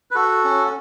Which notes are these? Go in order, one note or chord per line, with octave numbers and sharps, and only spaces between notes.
B4
F#4 A4
C#4